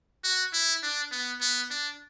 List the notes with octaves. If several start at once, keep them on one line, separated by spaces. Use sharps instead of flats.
F#4
E4
D4
B3
B3
D4